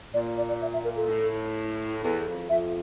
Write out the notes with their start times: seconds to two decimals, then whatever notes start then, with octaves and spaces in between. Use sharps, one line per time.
0.14 A#2 D5
0.37 D5
0.49 D5
0.62 E5
0.73 E5
0.84 A#4
0.96 A4
1.08 A2
2.03 E2 A4
2.27 F2
2.49 F2 E5